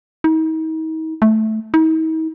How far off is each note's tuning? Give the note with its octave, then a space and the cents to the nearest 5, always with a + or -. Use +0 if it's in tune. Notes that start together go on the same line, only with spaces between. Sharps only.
D#4 +40
A3 -10
D#4 +45